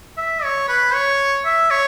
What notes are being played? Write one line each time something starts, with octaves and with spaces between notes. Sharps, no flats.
E5
C#5
B4
C#5
E5
C#5